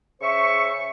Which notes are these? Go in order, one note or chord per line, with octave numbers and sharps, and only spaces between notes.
C#3 C5 E5 C#6